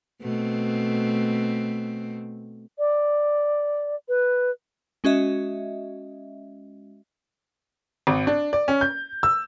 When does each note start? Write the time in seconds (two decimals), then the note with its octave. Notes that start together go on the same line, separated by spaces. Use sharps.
0.22 B2 A3 C4
2.79 D5
4.08 B4
5.04 G#3 C#4 F#4 D#5 E5
8.07 G#1
8.27 D4
8.53 D5
8.68 C#4
8.81 G6
9.23 E6